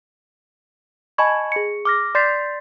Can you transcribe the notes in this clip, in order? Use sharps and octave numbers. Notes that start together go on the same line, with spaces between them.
D#5 G#5 A5 B5 C#6 G#6
G#4 C#7
D6 F6 A#6
D5 C6 G6 A6 B6 C7